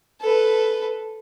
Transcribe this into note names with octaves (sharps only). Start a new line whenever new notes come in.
A4 B4